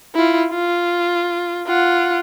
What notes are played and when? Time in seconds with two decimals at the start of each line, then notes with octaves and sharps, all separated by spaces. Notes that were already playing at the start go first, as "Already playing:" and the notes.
0.15 E4 F4
0.51 F4
1.67 F4 F#5